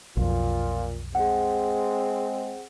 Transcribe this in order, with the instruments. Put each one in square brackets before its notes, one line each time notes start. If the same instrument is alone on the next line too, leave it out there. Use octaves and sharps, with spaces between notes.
[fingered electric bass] B1 F2 [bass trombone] A#2 [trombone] F4
[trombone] G#3 [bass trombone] C4 [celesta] G#4 F#5